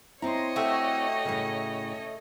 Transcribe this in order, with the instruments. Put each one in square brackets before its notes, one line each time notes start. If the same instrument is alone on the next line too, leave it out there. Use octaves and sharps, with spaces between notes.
[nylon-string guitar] C4 E4 [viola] C#5 D#5 [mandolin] A#5 C6
[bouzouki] A3 [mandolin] F#4 G4 E5
[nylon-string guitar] A2 C#3